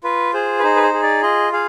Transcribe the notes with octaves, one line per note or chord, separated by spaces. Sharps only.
F4 B4
G#4 C5
B4
D#4 C5
B4
C5
G#4
D5
F4 D#5
G#4 F5